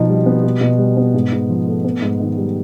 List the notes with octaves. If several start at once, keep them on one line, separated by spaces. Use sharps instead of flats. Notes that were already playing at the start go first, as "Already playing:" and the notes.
Already playing: B2 F3 D#4
G3
B3
B2
B2
G3
B3
G#2
G#2
F3
A3
B3
G#2
D#3
G3